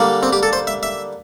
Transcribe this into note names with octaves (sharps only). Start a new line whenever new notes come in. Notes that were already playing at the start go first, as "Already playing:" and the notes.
Already playing: D3 G3 A#3
C4
G4
A4
C5
E5
E5